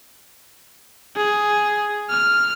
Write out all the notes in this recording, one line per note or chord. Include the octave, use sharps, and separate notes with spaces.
G#4
F6